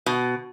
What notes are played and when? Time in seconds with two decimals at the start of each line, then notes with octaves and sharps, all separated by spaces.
0.06 B2